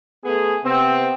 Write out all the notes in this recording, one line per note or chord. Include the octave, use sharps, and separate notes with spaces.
A3 B3 G#4
C3 B3 C4